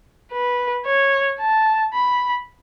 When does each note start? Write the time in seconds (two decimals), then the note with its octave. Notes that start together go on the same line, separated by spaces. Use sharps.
0.33 B4
0.86 C#5
1.40 A5
1.94 B5